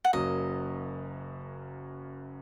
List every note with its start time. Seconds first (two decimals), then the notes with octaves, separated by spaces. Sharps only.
0.05 F#5
0.13 F#1 F#2 F#3 A#3 D#5